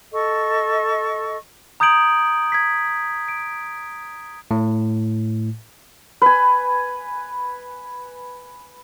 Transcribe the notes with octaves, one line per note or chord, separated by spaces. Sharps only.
A4 D#5 C#6
A#5 D#6 G6 G#6 D7 F#7
G#6 B6
D7
A2
B4 G#5